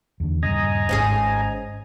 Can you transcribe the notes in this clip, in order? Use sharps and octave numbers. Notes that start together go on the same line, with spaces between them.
E2 D3
D#1 G2 C#3 D#5 G#5 A#5
D1 G#1 G#2 C#4 G#4